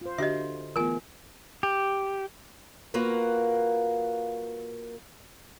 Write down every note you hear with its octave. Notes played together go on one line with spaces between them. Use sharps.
F4 C5
D3 D4 F#4 G4 D#5 E5
E3 A3 B3 F4 G#4 A#4 G#5
G4
A#3 F4 F#4 A#4 B4